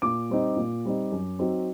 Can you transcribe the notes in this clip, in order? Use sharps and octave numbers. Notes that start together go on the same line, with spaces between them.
A#2 D6
G3 C4 D#4
A#2
G3 C4 D#4
F#2
F#3 C4 D#4